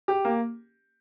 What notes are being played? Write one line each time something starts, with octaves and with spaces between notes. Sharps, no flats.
G4
A#3